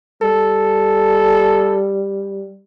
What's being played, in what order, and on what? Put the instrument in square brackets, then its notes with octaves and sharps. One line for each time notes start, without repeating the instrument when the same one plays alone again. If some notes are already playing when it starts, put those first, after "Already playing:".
[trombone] G3 [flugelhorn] A4